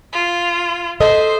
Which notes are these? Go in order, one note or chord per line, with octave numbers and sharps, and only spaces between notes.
F4
A4 C5 D#5 E5